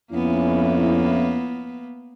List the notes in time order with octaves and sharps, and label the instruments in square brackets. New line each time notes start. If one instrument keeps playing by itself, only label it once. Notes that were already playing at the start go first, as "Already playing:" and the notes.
[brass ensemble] F2 C#4 E4 [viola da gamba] A#3 B3